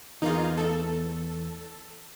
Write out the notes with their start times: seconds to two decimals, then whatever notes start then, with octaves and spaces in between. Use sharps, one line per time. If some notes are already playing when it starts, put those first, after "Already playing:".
0.22 E2 A#3 D#4 F4 G#4
0.57 A3 A4